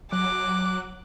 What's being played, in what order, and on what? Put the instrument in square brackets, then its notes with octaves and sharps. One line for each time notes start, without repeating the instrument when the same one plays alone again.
[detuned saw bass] F#3 [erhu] D6 [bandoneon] F#6